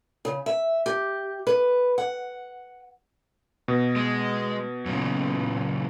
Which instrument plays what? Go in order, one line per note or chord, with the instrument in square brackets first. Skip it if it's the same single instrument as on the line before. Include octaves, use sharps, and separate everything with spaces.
[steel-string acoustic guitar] C#3
E5
G4
B4
F#5
[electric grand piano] B2
[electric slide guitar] G#3
F#2 A#2 C#3